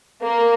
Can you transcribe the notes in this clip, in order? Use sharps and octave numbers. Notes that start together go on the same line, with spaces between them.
A#3